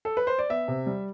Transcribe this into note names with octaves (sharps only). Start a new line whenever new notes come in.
A4
B4
C5
D5
B3 E5
C3
G3